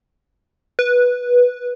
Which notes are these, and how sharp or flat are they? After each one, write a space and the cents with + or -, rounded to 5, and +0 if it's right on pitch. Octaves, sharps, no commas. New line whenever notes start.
B4 -10